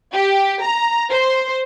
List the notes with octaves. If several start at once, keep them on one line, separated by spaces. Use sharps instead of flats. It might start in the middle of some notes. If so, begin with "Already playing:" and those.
G4
A#5
C5